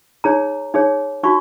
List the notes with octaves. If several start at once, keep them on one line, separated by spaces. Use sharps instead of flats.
D#4 G#4 C#5 A#5
D#4 G#4 C#5
D#4 F#4 C#6